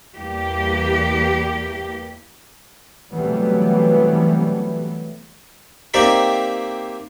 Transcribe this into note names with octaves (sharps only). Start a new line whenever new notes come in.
E2 G3 A#3 G4
C3 E3 F#3 G3 A3 B3
A#3 C4 D#4 G4 D5 E5